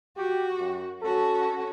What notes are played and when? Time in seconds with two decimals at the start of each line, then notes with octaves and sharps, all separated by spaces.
0.17 F#4 G4
0.59 F#2
1.02 C#4 F#4 A4